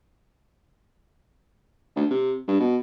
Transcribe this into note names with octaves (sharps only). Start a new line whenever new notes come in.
D2
C3
G2
B2